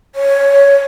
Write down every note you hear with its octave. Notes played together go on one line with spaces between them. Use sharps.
C#5